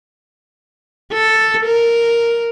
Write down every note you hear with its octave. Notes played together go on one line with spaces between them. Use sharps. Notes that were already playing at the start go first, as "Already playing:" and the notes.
A4
A#4